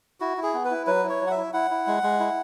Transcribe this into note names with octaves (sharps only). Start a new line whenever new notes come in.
E4 F#4
E4
G#4
B3
B4
E4
F#3 B4
E4
C#5
F#3
F#5
E5
E4
E4 F#5
E4
G#3
G#3
E4